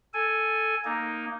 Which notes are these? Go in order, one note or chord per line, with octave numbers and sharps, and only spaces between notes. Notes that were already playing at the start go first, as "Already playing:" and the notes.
A4 G#5
A#3 D#4